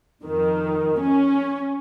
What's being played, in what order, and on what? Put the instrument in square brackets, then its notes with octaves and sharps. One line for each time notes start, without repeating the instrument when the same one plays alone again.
[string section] F2 D#3
C#4